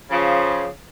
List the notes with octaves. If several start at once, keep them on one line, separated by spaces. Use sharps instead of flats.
C#3 F3